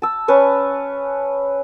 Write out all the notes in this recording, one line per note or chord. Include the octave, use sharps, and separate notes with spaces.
A5 E6
C#4 B4 A5 C#6